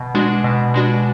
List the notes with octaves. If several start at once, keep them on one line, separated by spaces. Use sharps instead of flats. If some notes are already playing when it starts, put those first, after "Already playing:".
Already playing: B2
G#3 D4 F#4
B2
G#3 D4 F#4